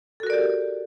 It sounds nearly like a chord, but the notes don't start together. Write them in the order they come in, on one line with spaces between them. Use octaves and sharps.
A4 F#4 A#4 D5 G4